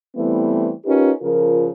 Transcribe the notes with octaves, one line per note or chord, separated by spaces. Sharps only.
E3 G3 A3 B3 C4 E4
C#4 D#4 F4 G4 A#4 B4
C#3 F3 F4 A#4